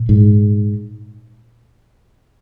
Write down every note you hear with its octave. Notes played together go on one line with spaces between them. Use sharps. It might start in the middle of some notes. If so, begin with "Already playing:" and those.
Already playing: A#2
G#2